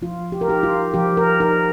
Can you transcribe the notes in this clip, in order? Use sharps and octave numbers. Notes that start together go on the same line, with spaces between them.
F3 F4
G4
A#4
D#4 G4
F4
F3 G4
A#4
D#4 A#4